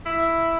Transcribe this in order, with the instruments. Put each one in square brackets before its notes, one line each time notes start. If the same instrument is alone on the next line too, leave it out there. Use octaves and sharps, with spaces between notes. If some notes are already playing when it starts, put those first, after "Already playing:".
[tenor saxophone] E4